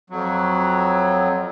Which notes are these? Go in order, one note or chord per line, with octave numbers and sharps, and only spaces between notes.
F2 F#3